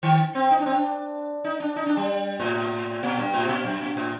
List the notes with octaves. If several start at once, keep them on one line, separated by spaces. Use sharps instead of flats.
D#3
C4
D#4
D4
C4
D4
D#4
D4
D#4
D4
G3
A2
A#2
G2
A2
C3
A#2
F#2
A#2
A2